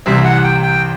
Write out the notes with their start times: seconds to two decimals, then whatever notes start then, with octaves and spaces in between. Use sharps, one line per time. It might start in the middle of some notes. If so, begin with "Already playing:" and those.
0.06 C2 C3 E3 G3 C4 E5
0.25 F#5
0.44 G5
0.63 G5